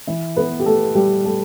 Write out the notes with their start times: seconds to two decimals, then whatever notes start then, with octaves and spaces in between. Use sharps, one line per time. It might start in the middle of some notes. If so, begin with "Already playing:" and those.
0.07 E3 E4
0.37 B3 B4
0.60 G4
0.66 A3 A4
0.95 G3 G4
1.24 A3 A4